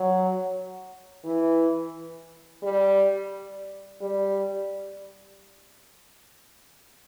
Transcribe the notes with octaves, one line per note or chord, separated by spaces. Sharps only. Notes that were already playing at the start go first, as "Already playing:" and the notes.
Already playing: F#3
E3
G3
G3